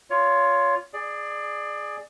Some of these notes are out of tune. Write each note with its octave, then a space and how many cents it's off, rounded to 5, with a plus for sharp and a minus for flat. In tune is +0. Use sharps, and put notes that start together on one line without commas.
F4 +0 C#5 +25
G#4 +0 D5 +20